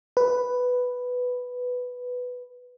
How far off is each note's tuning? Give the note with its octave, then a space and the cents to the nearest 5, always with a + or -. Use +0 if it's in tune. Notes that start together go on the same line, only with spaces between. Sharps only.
B4 +5